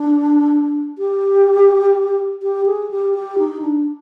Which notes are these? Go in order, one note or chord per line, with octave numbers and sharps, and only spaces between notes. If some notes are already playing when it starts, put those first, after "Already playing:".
Already playing: D4
G4
G4
G#4
G4
G4
D#4
D4